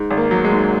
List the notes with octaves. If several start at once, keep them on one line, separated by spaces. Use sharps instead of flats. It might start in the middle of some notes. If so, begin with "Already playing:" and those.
Already playing: G#2
G#1
A#3
F#3
G#3
G#2